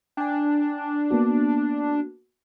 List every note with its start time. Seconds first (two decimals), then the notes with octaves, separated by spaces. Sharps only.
0.17 D4 G5 G#5
1.11 A#3 B3 F#4